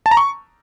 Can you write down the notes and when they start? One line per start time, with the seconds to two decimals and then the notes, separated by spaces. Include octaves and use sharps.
0.06 A5
0.11 A#5
0.17 C#6